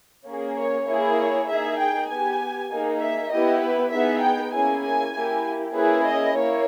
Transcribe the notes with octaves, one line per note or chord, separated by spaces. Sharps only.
A#3 C#4 G#4
C#5
A#3 E4 G#4
C#5
A#3 D#4 G#4 E5
G5
B3 G4 G#5
A#3 D#4 G#4
E5
B3 E4 G4 D#5
B4
B3 D#4 G#4 E5
G5
A#3 C#4 E4 G#4 G#5
G#5
A#3 E4 G4
A#3 C#4 E4 G#4 B4
D#5
A#3 E4 C#5